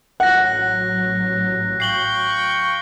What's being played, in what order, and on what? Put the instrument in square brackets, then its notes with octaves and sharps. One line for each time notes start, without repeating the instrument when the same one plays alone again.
[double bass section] A1 F#3 [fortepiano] F#5 [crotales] F#6 A#6
[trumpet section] F5 G5 C#6 [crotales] C7 F#7 G7